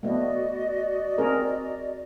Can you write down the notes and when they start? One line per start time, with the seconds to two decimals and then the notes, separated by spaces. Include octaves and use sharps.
0.03 A3 B3 F#4 D5 D#5
1.18 C4 G#4 A#4